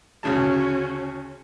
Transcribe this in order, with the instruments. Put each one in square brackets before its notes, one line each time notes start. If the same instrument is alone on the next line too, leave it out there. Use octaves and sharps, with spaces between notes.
[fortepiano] D2 C#3 A5 [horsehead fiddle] C#4 F#4